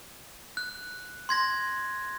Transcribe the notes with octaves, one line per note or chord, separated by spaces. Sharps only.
F#6
C6 G#6 A#6